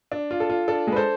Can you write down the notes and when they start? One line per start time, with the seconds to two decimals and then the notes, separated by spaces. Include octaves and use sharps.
0.12 D4
0.31 F4
0.40 A4
0.50 F4
0.68 D4 A4
0.87 G#3 B4
0.96 A4 C5